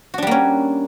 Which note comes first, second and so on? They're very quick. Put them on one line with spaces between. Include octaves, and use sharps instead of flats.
F#4 D4 G3 A#3 C#4